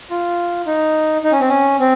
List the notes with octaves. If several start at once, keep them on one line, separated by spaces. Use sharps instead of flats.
F4
D#4
D#4
C#4
C4
C#4
C4